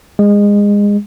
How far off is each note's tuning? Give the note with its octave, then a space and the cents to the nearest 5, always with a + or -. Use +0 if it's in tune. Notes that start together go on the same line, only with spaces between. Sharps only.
G#3 -25